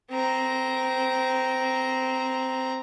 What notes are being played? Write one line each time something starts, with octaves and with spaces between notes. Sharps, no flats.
C4 A#5